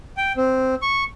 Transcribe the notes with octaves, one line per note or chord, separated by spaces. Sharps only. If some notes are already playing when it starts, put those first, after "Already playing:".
G5
C4
C#6